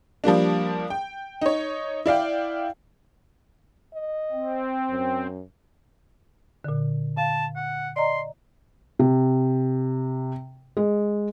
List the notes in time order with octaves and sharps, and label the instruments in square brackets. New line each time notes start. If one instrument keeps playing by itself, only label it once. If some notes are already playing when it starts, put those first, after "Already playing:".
[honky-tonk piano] F3 G3 A#3 D4
G5
D#4 C#5
E4 D5 F5 G5
[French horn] D#5
[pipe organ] C4
[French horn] F#2
[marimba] A#2 D3
[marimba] F5 [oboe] A5
[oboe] F#5
[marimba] D5 D#5 A#5 [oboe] C6
[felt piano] C3
G#3